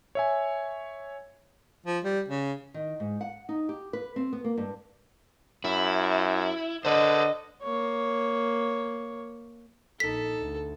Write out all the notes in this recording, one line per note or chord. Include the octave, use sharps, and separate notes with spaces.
C#5 E5 G#5
F3
G3
C#3
D#3
G#2
F#5
D#4
G4
B4
C4
B3
A#3
G2
F#2 E4
D3 B4 C5 D#5
A#3 C#5
A#1 D#4 A4 B6
D2